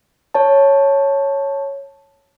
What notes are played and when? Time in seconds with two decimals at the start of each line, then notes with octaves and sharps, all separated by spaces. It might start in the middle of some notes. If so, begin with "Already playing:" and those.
0.34 C#5 A5